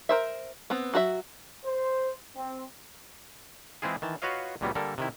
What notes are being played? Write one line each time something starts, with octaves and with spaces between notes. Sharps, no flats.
A#4 C5 E5
B3 C4
F#3 F#4 G#4 E5
C5
C4
E3 G#3 C4 E4 F4 G#4
D#3 E3 A5
F4 F#4 B4 C#5 D#5 F5
C#2 A#2 F#3 G3 A#3 B3
D3 G3 A#3 A4 A#4
C3 D#3 E4